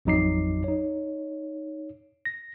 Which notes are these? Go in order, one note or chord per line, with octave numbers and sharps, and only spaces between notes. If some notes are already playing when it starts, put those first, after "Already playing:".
A1 F2 F#3 D#4 D6 C7
D#4 C#5
A#6